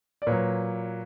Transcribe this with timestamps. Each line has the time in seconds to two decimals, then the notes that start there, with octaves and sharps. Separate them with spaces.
0.22 D5
0.27 A#2 F#3 B4 C#5